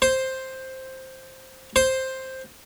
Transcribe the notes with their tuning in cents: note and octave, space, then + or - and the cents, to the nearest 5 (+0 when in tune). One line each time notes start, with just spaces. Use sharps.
C5 +5
C5 +5